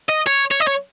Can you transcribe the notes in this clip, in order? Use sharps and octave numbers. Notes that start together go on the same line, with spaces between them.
D#5
C#5
C#5
D#5
C#5